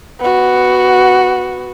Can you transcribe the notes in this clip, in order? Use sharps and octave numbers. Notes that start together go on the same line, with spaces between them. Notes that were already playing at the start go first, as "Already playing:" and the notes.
B3 F#4